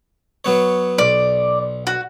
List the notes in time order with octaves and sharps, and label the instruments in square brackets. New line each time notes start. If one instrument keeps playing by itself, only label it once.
[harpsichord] F#3 B3 C#5
[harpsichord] B1 [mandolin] D5
[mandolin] F#4